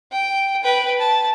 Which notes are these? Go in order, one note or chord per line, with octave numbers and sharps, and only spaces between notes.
G5
B4 G5
A5